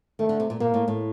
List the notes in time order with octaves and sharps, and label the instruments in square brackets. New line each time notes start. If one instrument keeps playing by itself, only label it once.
[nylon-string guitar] D#3 [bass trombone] A3
[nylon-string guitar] D3
C3
A#2
[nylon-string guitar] A#2 [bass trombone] A#3
[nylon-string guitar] A2
A2